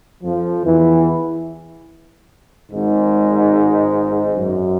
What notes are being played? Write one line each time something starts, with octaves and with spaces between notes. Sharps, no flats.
F2 F3
E2 E3
G#1 G#2
F#2